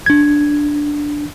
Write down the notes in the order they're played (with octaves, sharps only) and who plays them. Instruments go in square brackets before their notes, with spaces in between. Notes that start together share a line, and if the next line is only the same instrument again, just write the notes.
[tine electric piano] D4 G#6